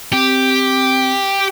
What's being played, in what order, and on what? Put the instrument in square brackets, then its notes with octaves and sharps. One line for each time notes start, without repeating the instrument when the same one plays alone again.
[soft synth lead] C4 [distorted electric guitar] G4